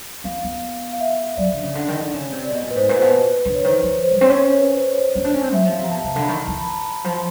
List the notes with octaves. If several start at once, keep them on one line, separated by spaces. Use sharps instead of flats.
C4 F5
B3
F5
E5
F#3 D5
D3
C#3
D3
D#3
D3
C#3
C3
D5
B2 D#5
A#2
B4
G#2 C5
A#2 B4
B2 C5
B4
D3
C#5
D#3 C5
F3
C5
G3
C4 C#5
C#4
C5
B4
C5
C#5
C5
C#4
D4
C#4
C4
F#3 E5
F3
F5
C3
A#5
B2 A5
C3
D3
B5
D#3 A#5
E3 A5
B5
A#5
F3